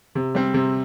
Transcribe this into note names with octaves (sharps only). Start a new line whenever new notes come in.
C3
G3 C4
C3